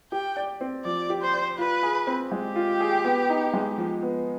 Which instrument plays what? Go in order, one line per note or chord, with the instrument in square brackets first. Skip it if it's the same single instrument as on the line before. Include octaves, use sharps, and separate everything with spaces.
[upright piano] G4 [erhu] G5
[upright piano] D5
C4
[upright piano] F3 [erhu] D5
[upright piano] G4
[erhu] C5
[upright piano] D5
[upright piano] F4 [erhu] B4
[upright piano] G#4
C4
[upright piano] G#3 [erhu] G4
[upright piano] F4
G#4
B3
D#4
G#3
F3
B3